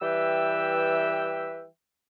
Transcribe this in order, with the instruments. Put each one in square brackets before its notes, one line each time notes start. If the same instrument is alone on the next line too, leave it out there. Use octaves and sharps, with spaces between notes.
[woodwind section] E3 G3 B4 E5 G5 E6